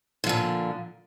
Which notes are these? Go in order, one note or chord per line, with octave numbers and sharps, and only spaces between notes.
A#2 D3 F3